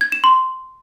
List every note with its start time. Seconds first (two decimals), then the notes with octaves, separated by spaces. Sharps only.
0.01 G#6
0.12 E7
0.24 C6